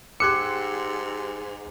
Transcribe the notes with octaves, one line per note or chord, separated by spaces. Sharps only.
G#2 G4 C6 D6 E6 F#6 G#6 C#7